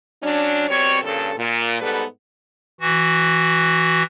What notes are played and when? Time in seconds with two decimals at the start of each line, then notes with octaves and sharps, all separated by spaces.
0.23 F#3 C#4 D4
0.69 B2 G3 C4 C#5
1.03 G2 A#2 C#3 A4
1.38 A#2
1.81 G#2 G3 B3 A4 B4
2.81 E3 F#4